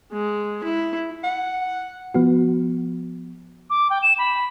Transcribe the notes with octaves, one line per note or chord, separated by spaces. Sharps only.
G#3
E4
F#5
F3 B3 F#4
D6
G5
E7
B5